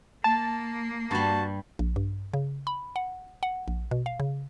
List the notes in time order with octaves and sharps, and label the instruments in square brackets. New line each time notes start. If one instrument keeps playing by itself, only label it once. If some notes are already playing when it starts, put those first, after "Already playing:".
[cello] A#3 [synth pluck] A5
[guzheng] G2 G3 [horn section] F#4 A5
[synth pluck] A#1
G2
C#3
B5
F#5
F#5
A#1
B2
F5
C#3